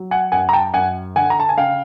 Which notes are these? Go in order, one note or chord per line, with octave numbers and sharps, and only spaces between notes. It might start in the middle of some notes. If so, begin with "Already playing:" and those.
Already playing: F#3
F#5 G#5
F#2 F#5 G#5
A#5
G5 A5
F#2 F#5 G#5
D3 F#5 G#5
A#5
A5
G#5
C#3 F5 G5